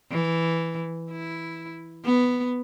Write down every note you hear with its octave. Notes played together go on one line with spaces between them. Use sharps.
E3
E4
B3